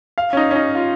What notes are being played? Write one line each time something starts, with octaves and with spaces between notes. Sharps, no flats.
F5
C#4
D#4
C#4
D#4
F4